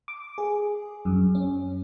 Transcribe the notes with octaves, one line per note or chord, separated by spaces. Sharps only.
D6
G#4
F#2
C#4